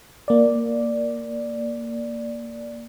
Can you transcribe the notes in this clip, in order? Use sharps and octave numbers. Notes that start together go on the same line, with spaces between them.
A#3 D5